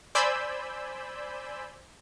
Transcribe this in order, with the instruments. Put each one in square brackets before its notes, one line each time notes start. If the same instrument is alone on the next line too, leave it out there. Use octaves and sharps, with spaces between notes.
[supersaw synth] C5 D5 G#5 B5 E6 G6